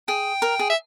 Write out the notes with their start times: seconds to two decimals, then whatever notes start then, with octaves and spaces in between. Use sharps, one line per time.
0.08 G#4 G5
0.42 A#4
0.59 G#4
0.70 E5